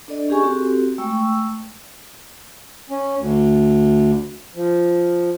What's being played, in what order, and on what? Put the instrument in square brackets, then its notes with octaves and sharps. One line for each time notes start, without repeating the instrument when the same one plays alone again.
[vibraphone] D4 A4 D5 D#5
C#4 G4 G#4 G#5 C#6
C4 F#4 G4 A4
G#3 A3 G5 C#6 E6
[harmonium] C#4
D2
F3